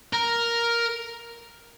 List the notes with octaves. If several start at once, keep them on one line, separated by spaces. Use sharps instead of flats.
A#4